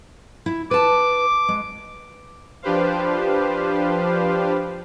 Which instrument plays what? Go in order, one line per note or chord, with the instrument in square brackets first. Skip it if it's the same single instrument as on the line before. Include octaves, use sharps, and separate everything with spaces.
[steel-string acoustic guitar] E4
[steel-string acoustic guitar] B4 A5 [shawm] D6
[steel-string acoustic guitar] G#3
[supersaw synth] F3 D4 G4 B4 C5 F5